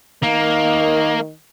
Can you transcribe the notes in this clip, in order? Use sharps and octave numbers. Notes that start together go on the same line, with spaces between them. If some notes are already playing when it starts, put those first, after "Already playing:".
D#3 A#3